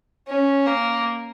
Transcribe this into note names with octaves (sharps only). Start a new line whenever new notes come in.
C#4
A#3